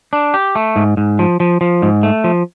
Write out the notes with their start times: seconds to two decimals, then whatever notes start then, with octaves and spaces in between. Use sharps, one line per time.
0.13 D4
0.34 G4
0.55 A3
0.76 G#2
0.97 G#2
1.19 F3
1.40 F3
1.61 F3
1.82 G#2
2.03 A3
2.24 F3